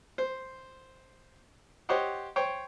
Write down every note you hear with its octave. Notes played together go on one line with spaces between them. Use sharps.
C5
G4 C5 C#5 D#5 F#5
C5 C#5 G5